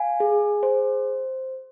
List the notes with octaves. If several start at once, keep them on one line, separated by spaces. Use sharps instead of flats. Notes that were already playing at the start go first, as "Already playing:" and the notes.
Already playing: F5 G#5
G#4
C5